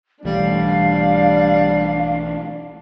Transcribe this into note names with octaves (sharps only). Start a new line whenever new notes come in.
B1 E3 G3 A3 D4 F5